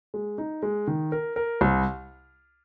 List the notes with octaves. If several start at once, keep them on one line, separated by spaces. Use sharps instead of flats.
G#3
D#4
G#3
D#3
A#4
A#4
C2